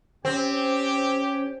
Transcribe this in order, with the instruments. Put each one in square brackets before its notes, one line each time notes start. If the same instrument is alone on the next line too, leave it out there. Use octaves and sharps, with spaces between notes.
[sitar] C4 [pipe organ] C#4 C5 C#5 [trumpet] G4